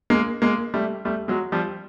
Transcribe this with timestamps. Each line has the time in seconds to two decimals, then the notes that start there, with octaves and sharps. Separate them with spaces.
0.10 G#3 A#3
0.42 G#3 A#3
0.74 G3 A3
1.05 G3 A3
1.28 F#3 G#3
1.52 F3 G3